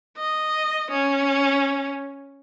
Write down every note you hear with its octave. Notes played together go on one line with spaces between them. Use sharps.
D#5
C#4